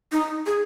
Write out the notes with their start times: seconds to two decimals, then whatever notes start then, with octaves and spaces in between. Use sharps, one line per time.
0.12 D#4
0.46 G#4